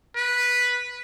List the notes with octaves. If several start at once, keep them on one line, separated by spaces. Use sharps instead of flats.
B4